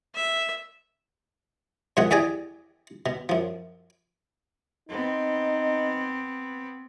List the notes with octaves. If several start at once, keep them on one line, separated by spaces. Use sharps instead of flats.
E5
F#2 B2 F3 G#3 G#4 F#5
E2 G4 G#4 D5 D#5 G#5
B2
F#2 F3
B3 C4 D#4